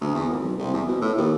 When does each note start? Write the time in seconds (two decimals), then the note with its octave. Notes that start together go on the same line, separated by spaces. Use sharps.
0.01 D2
0.15 E2
0.29 G#1
0.40 B1
0.59 C2
0.74 E2
0.88 B2
1.01 A2
1.17 D#2